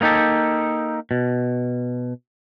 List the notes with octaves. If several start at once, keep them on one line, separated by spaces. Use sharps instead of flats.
A#3 B3 D#4 G4 A4
B2